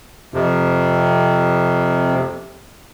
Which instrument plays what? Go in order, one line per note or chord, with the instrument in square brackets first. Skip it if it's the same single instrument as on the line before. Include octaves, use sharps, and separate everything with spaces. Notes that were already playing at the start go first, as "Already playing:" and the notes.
[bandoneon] F2 C3